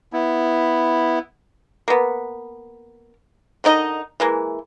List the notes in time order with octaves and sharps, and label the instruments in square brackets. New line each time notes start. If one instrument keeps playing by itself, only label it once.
[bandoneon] B3 E4
[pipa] A#3 B3
D3 D#3 D#4 D#5
E3 G#3 A#3